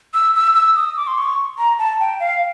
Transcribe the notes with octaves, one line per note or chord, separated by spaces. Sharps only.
E6
E6
E6
D#6
D6
C6
C#6
A#5
A5
G5
F5